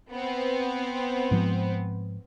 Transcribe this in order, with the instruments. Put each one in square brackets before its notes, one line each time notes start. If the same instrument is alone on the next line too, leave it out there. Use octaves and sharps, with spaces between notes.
[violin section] B3 C4
[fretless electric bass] G#2 F3